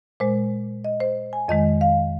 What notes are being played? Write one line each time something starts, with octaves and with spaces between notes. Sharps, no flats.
A#2 G#3 C5
D#5
C5
G#5
F2 D#3 G#3 D#5
F5